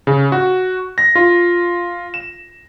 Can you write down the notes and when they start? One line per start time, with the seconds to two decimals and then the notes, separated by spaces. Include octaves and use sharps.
0.07 C#3
0.32 F#4
0.98 A#6
1.15 F4
2.14 E7